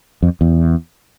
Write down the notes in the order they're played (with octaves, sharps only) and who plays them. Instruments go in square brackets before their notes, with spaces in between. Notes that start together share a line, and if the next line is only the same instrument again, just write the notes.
[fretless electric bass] F2
E2